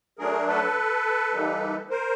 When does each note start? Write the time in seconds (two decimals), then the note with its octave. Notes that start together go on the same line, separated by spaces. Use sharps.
0.19 F#3 A3 D4 G#4 A#4
0.48 A4 B4
1.33 E3 G3 A#3 D#4
1.90 A#4 C5